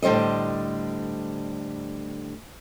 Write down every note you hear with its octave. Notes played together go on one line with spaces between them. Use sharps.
A2 D3 G3 C5 D#5